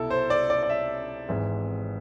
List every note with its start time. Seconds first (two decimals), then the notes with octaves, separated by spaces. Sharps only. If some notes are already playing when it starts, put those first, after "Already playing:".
Already playing: C2 B2 E4 A4
0.10 C5
0.30 D5
0.50 D5
0.63 D5
0.69 E5
1.29 G#1 G#2 E3